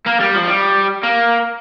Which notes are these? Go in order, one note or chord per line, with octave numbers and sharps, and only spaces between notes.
A#3
G3
F3
G3
A#3